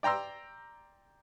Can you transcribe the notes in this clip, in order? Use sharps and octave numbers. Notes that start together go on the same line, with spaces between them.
D5 G5 A#5 C6 E6